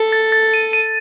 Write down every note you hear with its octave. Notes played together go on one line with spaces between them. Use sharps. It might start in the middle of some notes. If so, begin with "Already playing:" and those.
Already playing: A4
A6
A6
D#7
D#7